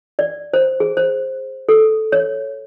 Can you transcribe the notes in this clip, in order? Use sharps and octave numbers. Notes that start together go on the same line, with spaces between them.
D5
C5
G#4
C5
A4
C#5